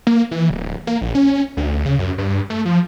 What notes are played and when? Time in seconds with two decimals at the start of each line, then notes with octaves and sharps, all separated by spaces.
0.07 A#3
0.31 E3
0.50 D1
0.87 A#3
1.01 A#1
1.15 C#4
1.57 D2
1.86 C#3
1.99 F#2
2.18 G2
2.50 A3
2.65 F3